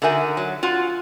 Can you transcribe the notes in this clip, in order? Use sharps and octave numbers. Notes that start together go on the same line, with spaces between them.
D3 D#4 F#4 A#4 E5 G#5
F#3
F4 F#4